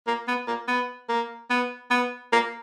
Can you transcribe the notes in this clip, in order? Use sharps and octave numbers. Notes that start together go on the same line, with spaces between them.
A#3
B3
A#3
B3
A#3
B3
B3
A#3